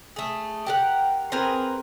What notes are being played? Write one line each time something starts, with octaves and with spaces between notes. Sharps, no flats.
A3 G#4
G4 A#4 F#5
C4 G#4 A#4 B4